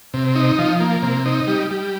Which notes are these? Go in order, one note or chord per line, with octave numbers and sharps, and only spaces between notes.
C3
D#4
F3
A#3
C3
D#4
G3
G3